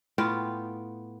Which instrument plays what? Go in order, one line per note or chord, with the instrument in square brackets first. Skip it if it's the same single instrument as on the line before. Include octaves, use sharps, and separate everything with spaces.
[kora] A2 B3 F4 G5